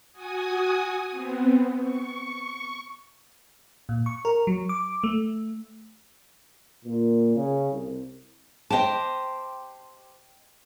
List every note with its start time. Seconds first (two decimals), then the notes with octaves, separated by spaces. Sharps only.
0.12 F#4 G#5 D#6
1.11 B3 C4
1.80 C#6
3.89 A#2
4.06 C#6
4.25 A#4
4.47 F#3
4.69 D6
5.04 A3
6.85 A#2
7.35 C#3
7.71 C2
8.70 G4 C5 D#5 G5 A5